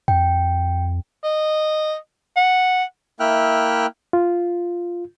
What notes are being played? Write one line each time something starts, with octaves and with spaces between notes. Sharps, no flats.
F2 G5
D#5
F#5
A#3 E4 E5 G5 F6 F#6
F4